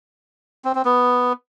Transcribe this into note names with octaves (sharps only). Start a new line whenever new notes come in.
C4
C4
B3